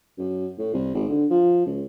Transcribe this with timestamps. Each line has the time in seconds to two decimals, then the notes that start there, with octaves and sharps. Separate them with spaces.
0.18 F#2
0.58 A2
0.73 C2
0.95 G#1
1.08 D3
1.31 F3
1.66 C#2